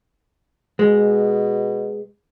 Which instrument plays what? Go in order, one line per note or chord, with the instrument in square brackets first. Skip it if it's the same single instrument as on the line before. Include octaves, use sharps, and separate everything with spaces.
[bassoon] B2 [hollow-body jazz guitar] G#3